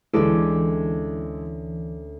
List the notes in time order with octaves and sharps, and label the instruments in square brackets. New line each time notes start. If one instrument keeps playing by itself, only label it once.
[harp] D2 C#4 D5 [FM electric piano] E3 [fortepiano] G#3 A4